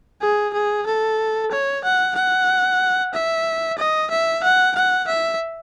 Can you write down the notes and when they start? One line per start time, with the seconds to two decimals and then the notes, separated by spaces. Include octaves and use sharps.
0.21 G#4
0.53 G#4
0.86 A4
1.51 C#5
1.84 F#5
2.15 F#5
3.14 E5
3.78 D#5
4.10 E5
4.43 F#5
4.75 F#5
5.07 E5